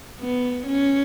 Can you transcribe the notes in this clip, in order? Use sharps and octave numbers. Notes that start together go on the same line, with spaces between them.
B3
C#4